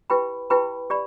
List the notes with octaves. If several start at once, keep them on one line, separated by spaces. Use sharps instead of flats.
E4 G4 B4 G5 B5
E4 G4 B4 G5 B5
G4 D5 B5